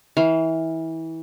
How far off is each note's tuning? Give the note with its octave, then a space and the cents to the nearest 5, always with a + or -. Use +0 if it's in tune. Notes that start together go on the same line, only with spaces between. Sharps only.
E3 -25 F5 +0